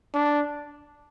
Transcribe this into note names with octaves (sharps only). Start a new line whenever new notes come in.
D4